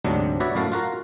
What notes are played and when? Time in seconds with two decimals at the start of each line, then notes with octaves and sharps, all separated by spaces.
0.05 D2 G#2 C3 F#3 D4
0.40 F#4 B4 C#5 D5 E5
0.55 F#2 A2 F#4 F5 A5
0.72 F4 F#4 A#4 F5